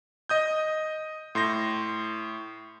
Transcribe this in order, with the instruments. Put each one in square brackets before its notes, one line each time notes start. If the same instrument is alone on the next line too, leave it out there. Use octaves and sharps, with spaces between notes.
[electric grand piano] D#5 D#6 G6
A2 C6 G6 A#6